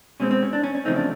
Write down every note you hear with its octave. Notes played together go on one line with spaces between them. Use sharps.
B2 G#3 C4 C#4
C4
C#4
D4
C#4
C#4
E2 C#3 F3 A3 C4 D#4
D4